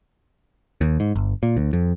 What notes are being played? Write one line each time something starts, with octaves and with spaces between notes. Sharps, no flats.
D#2
G#2
G1
A#2
D2
F2